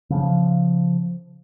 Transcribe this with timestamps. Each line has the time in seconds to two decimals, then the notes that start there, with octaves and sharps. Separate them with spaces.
0.10 C#3 F3